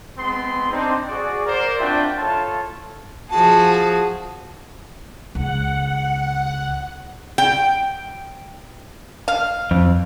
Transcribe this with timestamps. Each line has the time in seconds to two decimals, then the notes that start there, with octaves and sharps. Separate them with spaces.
0.18 G#3 B3 C4 B5 C6
0.70 C4 D4 D#4
1.09 F#4 G#4 D5
1.45 A#4 C5 D5
1.79 C4 D4 F4 F#4 E5 G5
2.17 E4 F4 A4 C#5 A5
3.30 F3 F#4 G#4 A5
5.35 C#2 F#5
7.38 G5
9.28 F5
9.71 F2